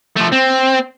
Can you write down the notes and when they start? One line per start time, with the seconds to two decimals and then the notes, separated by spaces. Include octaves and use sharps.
0.17 F3 A3
0.33 C4